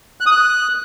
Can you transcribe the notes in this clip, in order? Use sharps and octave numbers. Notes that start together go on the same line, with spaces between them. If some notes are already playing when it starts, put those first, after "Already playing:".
F#6
D#6
F#6